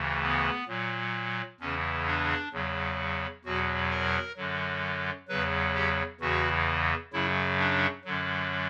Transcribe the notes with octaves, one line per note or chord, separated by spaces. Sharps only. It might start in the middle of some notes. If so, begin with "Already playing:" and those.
Already playing: D2 C#3 E3
B3
A#2 F#3
E2 C#3 E3 C#4
D4
E2 C#3 F#3
E2 B2 F#3 F#4
A#4
F#2 D3 F#3
E2 C#3 F#3 B4
G4
E2 C#3 E3 F#4
F#2 C#3 F#3 E4
D4
F#2 D3 F#3